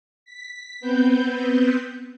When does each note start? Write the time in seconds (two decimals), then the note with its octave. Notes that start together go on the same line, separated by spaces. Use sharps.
0.25 B6
0.80 B3 C4 B4 G6